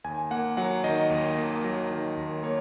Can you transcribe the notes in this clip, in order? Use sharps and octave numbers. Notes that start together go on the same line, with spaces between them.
D#2 G#5
A#3 F#5
F#3 F#5
D#3 D#5
D#2
A#3
F#3
D#3
D#2
A#3 C#5